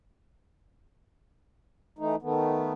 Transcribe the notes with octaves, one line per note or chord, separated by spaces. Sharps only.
E3 A3 D#4
D#3 A3 B3